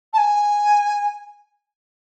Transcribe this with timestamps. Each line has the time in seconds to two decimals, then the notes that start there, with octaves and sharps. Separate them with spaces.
0.13 A5
0.17 G#5